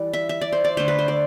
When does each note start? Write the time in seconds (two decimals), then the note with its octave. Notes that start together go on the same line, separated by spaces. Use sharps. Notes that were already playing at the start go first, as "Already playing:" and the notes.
Already playing: E3 G3 D5
0.13 E5
0.29 E5
0.41 D5
0.52 C5
0.64 D5
0.77 D3 A3 C5
0.88 B4
0.99 C5
1.08 D5